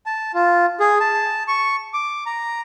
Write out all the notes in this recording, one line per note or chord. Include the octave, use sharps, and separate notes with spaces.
A5
F4
G#4
A5
C#6
D6
A#5